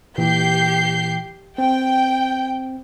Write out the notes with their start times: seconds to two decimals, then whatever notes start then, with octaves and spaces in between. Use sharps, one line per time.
0.18 A#2 E3 G4 G6 C7
1.58 C4 G5